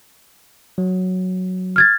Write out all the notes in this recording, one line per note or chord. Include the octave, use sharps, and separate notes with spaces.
F#3
F6 G#6 A6